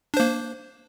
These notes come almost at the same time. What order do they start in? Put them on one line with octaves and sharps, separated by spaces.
D4 C5 A#3